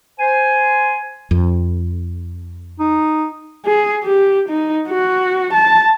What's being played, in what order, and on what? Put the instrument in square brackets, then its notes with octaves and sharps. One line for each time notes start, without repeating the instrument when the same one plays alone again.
[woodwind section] C5 G#5
[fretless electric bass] F2
[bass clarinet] D#4
[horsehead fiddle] G#4
G4
D#4
F#4
A5